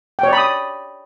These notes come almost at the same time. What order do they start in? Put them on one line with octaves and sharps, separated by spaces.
G5 C#5 D5 B5 D#6